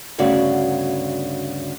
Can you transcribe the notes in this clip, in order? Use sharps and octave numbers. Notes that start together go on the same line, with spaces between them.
D2 G2 C#3 B3 F#4 D5